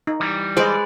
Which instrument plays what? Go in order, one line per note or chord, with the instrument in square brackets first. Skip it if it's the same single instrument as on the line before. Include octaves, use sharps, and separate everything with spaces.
[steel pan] D#4
[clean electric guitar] E3 G3
[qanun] G#3 B4 D5 [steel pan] C5 D#5